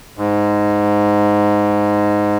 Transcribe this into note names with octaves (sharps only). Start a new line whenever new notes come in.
G#2